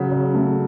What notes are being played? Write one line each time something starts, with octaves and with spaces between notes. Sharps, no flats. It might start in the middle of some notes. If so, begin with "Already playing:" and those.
Already playing: C#3 F#3
C#3
A3